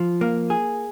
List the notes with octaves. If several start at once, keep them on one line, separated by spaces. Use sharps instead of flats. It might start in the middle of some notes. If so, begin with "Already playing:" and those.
Already playing: F3
A#3
G#4